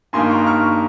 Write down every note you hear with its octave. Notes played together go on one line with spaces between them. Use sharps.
G2 D#3 A#3 D#4 G#5 C6
A#5 C#6
C#6 F6